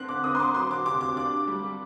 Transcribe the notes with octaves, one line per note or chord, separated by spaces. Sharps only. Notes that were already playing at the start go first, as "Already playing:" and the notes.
Already playing: D3 C4 F#6
D6
C4 D#6
C6
D6
F#3 C6
D6
C3 D6
D6
D4 D6
G3